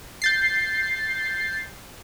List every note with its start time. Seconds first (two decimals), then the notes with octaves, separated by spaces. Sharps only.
0.22 G6 A6 C7